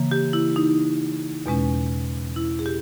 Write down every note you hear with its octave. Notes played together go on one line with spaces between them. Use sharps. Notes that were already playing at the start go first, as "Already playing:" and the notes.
Already playing: C#3 E3 A#3
G4
E4
D#4
E2 B2 G#3 C#4
E4
G#4
G4